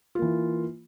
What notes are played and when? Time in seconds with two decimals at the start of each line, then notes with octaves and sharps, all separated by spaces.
0.15 F4
0.19 A#3
0.22 E3